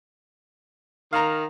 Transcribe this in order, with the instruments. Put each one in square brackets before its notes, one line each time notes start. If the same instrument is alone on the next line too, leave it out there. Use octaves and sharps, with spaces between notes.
[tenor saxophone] D#3 [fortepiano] F5 A#5